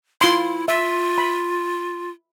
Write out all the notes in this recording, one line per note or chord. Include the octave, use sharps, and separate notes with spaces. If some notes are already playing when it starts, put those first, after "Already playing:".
E4 F4 C6
F4 E5
B5